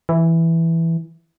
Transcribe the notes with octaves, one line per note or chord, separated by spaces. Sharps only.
E3